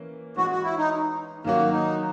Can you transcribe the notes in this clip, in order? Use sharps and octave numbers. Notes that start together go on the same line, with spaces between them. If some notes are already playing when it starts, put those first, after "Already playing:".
Already playing: E3 A#3 C#4
E3 G#3 C#4 F#4
F#4
E4
D#4
D#3 F#3 A#3 C#4 F#4
D#4